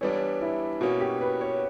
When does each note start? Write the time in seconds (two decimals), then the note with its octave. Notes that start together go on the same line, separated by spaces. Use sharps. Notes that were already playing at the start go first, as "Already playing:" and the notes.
0.01 E3 G3 B3 D4 C#5
0.41 E4
0.81 B2 A#3 C#4 F#4
1.00 G4
1.21 B4
1.41 C#5